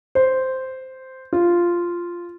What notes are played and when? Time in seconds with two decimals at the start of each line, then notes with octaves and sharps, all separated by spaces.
0.15 C5
1.33 F4